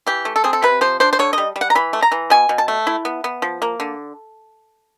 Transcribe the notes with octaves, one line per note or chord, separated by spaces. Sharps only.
E3 G4
A3
A4
C4 G#4
A4
C3 B4
F3 C5
D4 C5
C5
D3 C#5
G3 D#5
G3
F#5
A#5
E3 B5
A3
A#5
E3
B2 G#5
B2
A5
A3
E4
B3
B3
F3
A#3
D3